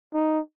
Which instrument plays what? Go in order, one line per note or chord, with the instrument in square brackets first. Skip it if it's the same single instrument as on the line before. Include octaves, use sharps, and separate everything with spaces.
[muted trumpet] D#4